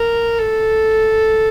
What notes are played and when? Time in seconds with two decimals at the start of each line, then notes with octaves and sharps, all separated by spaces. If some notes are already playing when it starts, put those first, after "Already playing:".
Already playing: A#4
0.39 A4